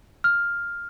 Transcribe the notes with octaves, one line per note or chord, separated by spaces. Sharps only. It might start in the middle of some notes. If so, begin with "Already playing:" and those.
F6